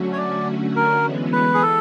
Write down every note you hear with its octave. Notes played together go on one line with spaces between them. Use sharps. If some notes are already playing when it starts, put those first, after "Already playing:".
Already playing: D3 F#3 A3 C#4 F#4
C#5
D5
A#4
E3 G#3 B3
B4
G#4
A4